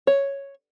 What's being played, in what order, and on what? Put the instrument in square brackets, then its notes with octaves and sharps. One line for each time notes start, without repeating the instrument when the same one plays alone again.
[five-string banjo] C#5